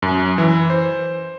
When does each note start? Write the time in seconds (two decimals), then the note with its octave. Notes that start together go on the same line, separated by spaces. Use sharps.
0.02 F#2
0.38 E3
0.70 C5